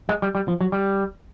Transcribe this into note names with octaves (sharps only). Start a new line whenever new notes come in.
G#3
G3
G3
F3
F#3
G3